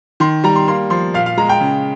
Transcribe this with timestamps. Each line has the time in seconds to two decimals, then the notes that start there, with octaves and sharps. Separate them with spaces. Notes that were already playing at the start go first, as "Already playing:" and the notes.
0.20 D#3 C6
0.44 G3 A#5
0.56 C6
0.68 A#3 C6
0.90 F3 C6
1.14 A#2 F5
1.26 F5
1.37 G#3 A#5
1.49 G5
1.60 C#3